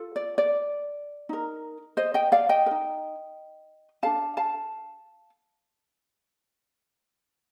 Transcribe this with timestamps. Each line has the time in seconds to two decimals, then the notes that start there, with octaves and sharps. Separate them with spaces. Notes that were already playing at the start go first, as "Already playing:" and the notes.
Already playing: F4 A4
0.16 D5
0.38 D5
1.29 D#4 A#4
1.97 C5 D#5
2.14 D#5 G5
2.32 D5 F5
2.49 D#5 G5
2.66 A#4
2.71 D#4
4.03 D4 A4 F5 A5
4.37 F5 A5